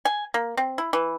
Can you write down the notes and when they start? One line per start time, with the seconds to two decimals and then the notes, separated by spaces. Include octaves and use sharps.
0.05 G#5
0.34 A#3
0.57 C4
0.78 E4
0.93 E3